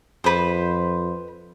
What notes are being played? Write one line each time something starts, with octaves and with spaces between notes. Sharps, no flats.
F2 B4 C5